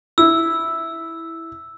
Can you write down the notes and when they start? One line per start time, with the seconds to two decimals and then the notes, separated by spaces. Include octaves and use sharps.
0.18 E4 E6